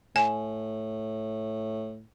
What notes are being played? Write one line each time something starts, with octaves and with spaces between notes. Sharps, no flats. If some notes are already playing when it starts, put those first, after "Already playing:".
A2 G#5